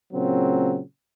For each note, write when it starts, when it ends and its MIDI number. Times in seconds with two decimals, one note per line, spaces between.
0.13 0.80 46
0.13 0.80 49
0.13 0.80 54
0.13 0.80 60